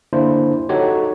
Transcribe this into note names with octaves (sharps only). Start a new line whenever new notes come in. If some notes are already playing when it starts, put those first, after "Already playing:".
D3 A#3 D4 E4 C5
D#4 F#4 G4 A4 C#5